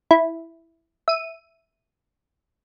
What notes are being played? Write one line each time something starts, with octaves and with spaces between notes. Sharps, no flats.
E4
E5 D#7